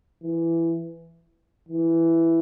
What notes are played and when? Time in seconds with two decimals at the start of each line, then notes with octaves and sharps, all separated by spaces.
0.23 E3
1.69 E3